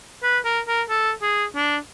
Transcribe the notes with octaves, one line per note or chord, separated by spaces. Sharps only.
B4
A#4
A#4
A4
G#4
D4